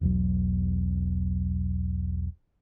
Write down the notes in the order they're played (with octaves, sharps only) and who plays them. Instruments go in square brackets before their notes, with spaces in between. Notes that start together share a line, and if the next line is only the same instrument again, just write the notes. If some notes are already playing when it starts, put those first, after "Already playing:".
[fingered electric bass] E1 B1 F#3